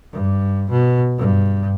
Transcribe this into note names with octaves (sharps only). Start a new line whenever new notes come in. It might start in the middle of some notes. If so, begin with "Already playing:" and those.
G2
B2
G2